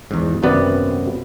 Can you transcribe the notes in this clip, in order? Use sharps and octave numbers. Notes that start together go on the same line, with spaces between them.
E2 G#2
G#1 F#2 C3 B3 B4 D5